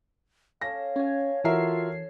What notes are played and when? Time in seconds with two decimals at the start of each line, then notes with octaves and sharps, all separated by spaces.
0.61 C#4 A4 F5 A#6
0.96 C#4 C#5 G#5
1.44 E3 F4 F#4 A4 A#4 E5 C7